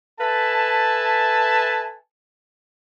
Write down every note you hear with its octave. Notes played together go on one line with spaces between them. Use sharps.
A4 B4 E5 G#5 A5